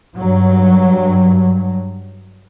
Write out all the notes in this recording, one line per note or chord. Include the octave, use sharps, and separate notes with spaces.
G2 F#3